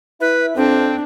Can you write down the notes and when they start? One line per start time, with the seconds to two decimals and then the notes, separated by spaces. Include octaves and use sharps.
0.21 E4 B4
0.56 F2 C4 D4